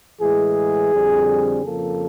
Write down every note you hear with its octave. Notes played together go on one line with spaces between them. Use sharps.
A2 E3 G#3 G#4
F2 D3 G3 C4
F2 C#3 F3 A#3 A4